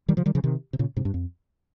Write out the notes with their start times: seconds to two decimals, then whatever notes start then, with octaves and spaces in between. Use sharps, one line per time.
0.08 D#3 G3
0.17 C#3 F3
0.26 D#3 G3
0.35 C#3 F3
0.44 C3 D#3
0.73 C3
0.79 A#2 C#3
0.97 G#2 C3
1.05 G2
1.14 F2